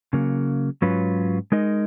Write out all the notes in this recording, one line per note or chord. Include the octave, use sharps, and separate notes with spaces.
C#3 F#3 A#3
G#2 F#3 C#4 F4 B4
G#3 D#4 A#4 D#5